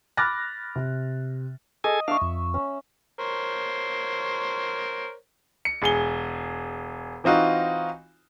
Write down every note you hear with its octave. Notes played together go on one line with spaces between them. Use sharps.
B5 D6 F6 F#6 A6 A#6
C3
G#4 A4 D#5 G#5
D4 E5 F5 C#6
F2
C#4
A#4 C5 C#5
C#7
E1 G#4 G7
E3 C4 D#4 F4 F#4